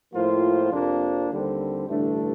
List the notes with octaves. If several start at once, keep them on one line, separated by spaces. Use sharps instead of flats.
A2 F3 A#3 F4 C5
F2 C3 F3 A#3 D4
D#2 D3 G3 C4
A1 G2 D3 A3 D4